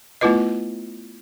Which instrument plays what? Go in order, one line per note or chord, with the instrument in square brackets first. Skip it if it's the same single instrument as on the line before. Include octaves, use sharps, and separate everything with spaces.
[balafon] A3 B3 E4 F4 B4 D#5